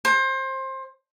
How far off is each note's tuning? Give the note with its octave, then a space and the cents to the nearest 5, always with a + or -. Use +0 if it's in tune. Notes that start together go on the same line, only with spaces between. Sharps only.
C5 +25